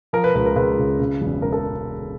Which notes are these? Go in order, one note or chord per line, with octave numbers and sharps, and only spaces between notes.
F3 A#4
B4
C#2 B4
A#4
C#2 B4
C#3
C#3
E1
E3 A#4
A4